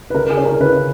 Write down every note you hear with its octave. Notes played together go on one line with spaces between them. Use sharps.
B4
C#3 A#4
G#4
C#4
A#4
C#3 B4